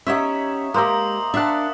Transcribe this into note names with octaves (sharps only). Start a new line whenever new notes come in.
C#4 D#4 G4 C#5 E5 F#5
G#3 A#3 G4 C5 A#5 D#6 E6
D4 D5 E5 F#5 A5